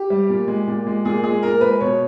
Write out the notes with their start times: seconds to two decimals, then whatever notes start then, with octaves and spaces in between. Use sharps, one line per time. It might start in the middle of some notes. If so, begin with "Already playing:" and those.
Already playing: G4
0.10 G3
0.29 A#2
0.48 G#3
0.67 A#2
0.87 G#3
1.05 A#2 G#4
1.24 G#3 G#4
1.43 A#2 A#4
1.61 G#3 B4
1.80 B2 C#5